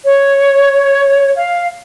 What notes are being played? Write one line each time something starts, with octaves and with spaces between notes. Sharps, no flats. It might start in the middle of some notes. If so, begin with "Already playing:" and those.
C#5
F5